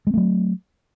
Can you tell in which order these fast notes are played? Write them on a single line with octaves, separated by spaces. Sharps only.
G#3 C4 A3 F#3